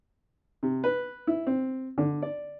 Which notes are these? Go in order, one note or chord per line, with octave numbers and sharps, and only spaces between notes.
C3
B4
E4
C4
D3
D5